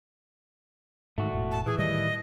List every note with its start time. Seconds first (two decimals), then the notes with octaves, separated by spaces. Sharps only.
1.18 G#2 D#3 A3 F#4
1.33 E1 A2
1.51 A5
1.66 A#2 E3 G#4
1.78 A2 D#3 G3 D#5